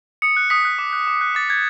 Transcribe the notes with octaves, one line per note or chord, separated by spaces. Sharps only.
D#6 C#7
F#6
D#6 B6
F#6
D6
F#6
D6
F#6
D6 A6
G6 G#6